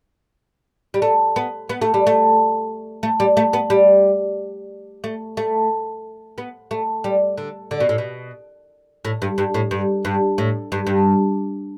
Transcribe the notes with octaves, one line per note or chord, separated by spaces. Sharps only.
G3
A3
B3
B3
A3
G3
A3
A3
G3
A3
B3
G3
A3
A3
B3
A3
G3
D3
D3
B2
A2
B2
A2
G2
G2
A2
G2
G2
A2
G2
G2